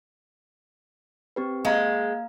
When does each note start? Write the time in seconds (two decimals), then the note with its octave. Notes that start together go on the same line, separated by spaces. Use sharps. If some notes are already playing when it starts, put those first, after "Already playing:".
1.36 C4 G4 B4
1.65 G#3 A#3 F5 A#5